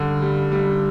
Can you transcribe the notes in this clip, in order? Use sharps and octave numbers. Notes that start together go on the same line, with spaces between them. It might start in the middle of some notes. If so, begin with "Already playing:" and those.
Already playing: G2 D3
G3
G3